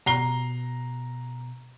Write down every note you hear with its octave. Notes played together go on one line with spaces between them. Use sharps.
B2 A#5 C7 G7